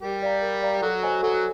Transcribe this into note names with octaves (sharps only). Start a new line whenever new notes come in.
G3 G4 A#4
D5 F5 A#5
A#4
D5 F5 A#5
F#3 F#4 A4
C5 D#5 G#5
F#3 F#4 A4